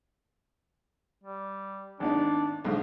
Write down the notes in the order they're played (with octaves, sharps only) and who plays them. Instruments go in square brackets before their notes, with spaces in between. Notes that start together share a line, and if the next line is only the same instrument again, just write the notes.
[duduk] G3
[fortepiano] G#1 B3 D#4 [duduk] D4
[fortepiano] B1 G#2 D3 [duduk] F3